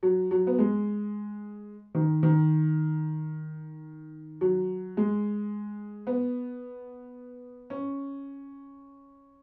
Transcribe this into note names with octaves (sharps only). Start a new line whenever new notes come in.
F#3
F#3
B3
G#3
D#3
D#3
F#3
G#3
B3
C#4